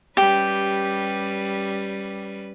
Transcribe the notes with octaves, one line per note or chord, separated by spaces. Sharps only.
G3 C#4 G4 B4